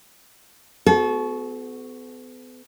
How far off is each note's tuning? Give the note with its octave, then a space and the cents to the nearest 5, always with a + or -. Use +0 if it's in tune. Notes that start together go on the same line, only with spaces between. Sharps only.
B3 +40 F#4 +0 A4 -40